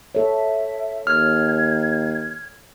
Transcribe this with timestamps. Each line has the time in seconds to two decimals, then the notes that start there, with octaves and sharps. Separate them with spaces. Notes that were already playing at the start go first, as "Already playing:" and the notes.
0.15 A4 C#5 E5
1.07 D#2 F6 G#6